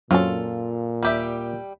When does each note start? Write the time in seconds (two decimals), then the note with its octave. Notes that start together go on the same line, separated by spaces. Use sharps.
0.11 F#2 A#2 F#3 C4 C#4 F4 A4
1.03 D#2 G3 G4 E5